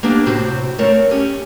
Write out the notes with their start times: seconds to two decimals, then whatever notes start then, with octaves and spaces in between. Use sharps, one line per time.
0.03 A#3 B3 D4 G4
0.26 A2 C3 C4 F#4
0.78 A3 C4 A#4 C#5
1.11 C#4 G4